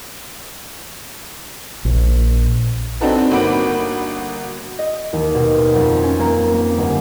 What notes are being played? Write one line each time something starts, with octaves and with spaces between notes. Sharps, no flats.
A#1
C4 D4 D#4 F#4 A4 B4
G1 A#3 F#4 B5 D6 D7
D#5
D#2
B2
F2
C#4
A#3
A#3
G1